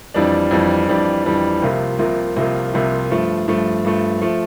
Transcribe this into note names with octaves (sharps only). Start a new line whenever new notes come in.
F2 E3 G3 D4
F2 E3 G3 D4
F2 E3 G3 D4
F2 E3 G3 D4
C2 C3 F3 A#3 F4
C2 C3 F3 A#3 F4
C2 C3 F3 A#3 F4
C2 C3 F3 A#3 F4
G2 F3 A3
G2 F3 A3
G2 F3 A3
F3 A3